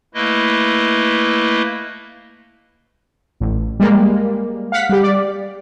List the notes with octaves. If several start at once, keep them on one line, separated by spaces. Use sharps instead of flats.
A3 A#3 E4 B4 D#5
A1
G3 G#3 A#3
F5 F#5 B6
G3 G4
D5